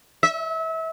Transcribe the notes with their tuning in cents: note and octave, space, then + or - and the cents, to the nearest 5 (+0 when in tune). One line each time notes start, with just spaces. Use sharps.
E5 -30